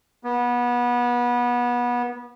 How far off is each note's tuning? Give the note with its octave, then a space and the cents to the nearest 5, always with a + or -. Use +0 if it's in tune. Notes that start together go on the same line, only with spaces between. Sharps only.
B3 -25